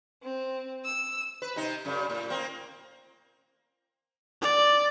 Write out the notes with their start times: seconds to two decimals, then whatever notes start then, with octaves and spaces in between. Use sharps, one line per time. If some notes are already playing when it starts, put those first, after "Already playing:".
0.23 C4
0.85 E6
1.42 B4
1.56 C3 D#4
1.85 F#2 C#3
2.10 A2
2.30 A#3 C4
4.42 D5